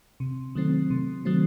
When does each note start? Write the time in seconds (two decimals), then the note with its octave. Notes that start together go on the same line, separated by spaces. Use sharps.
0.20 C3
0.55 D#3 F#3 A3 C4
0.90 C3
1.25 D#3 F#3 A3 C4